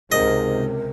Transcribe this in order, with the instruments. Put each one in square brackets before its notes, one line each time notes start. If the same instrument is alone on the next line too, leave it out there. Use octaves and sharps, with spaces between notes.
[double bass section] C#2 C3 [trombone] G#2 [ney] A#4 [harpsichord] D#5